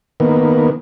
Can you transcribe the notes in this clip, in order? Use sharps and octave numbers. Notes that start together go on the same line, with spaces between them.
D#3 A#3 B3